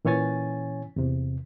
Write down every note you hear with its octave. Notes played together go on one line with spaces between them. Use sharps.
A#2 E3 C#4 C#5 G#5 A6
E2 C3